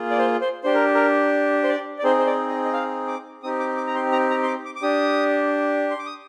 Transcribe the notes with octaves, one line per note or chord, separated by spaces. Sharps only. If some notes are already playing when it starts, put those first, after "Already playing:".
Already playing: A#3 F4 G#4
D5
C5
C5
D4 G4 C5
A#4
A#4
C5
D5
D5
C4 D#4 G#4 C5
C5
D5
D#5
D#5
F5
D6
C4 D#4 G4 D#6
D6
D6
A#5
C6
A#5
A#5
C6
D6
D6
D6
D4 G4 D#6
C6
D6
D#6